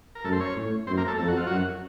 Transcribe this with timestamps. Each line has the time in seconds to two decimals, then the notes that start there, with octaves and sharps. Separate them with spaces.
0.15 A#4
0.24 F#2 A3 A4
0.32 C5
0.40 C#4 C#5
0.56 A2
0.87 F#2 C4 C5
0.97 A#3 A#4
1.08 A3 A4
1.18 F2 A4
1.28 F#4
1.37 F4
1.47 F#2 F#3 F#4